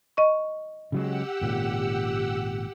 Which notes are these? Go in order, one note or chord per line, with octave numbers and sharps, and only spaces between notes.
D#5 C#6
C#3 F#3 G#3 G4 F#5 E6
G#1 A#2 C#3